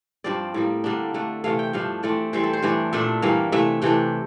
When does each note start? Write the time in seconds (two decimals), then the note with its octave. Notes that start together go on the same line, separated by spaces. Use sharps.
0.24 G2 F3 C4 D5
0.54 A2 G3 A#3
0.84 D3 G3 A#3 D4
1.14 D3 A3 D4
1.44 C3 E3 A3 F5
1.59 G5
1.73 G2 F3 A3 D4 F5
2.03 E3 A3 C4 D5
2.33 E3 G3 C4 C5
2.44 A4
2.53 C5
2.62 G2 E3 A3 D4 D5
2.93 A#2 A3 D4 E5
3.22 G2 E3 G3 A#3 F5
3.52 C3 E3 A3 E5
3.82 C3 E3 A3 D4 G5